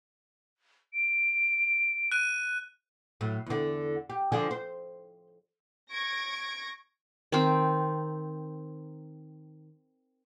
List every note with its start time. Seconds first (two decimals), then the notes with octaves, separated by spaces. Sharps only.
0.93 D7
2.12 F#6 D#7
3.21 A2 F#3
3.46 E2 D3
4.10 G4
4.32 D3 F3 G#4
4.51 C5
5.91 C#6 G#6 A#6 D7
7.32 D#3 C4